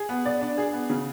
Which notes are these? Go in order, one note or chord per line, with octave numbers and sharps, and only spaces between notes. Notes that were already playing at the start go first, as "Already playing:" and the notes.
Already playing: G#4
B3
D5
D4
G#4
B3
C#3